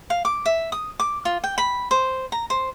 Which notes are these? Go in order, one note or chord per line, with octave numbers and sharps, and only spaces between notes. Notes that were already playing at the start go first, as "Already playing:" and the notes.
F5
D6
E5
D#6
D6
F4
G5
B5
C5
A#5
C5